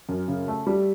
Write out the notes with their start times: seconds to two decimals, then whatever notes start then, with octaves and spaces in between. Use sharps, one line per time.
0.09 F#2
0.28 C#3
0.48 A3
0.67 G3